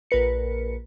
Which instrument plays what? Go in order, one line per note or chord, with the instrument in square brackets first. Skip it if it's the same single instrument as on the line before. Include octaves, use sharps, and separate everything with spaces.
[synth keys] A#1 A#4 B4 C#7